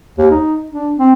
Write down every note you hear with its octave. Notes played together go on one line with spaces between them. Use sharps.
D#2
D#4
D4
C4